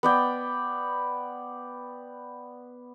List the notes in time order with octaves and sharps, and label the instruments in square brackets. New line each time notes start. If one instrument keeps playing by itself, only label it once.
[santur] B3 D5 G5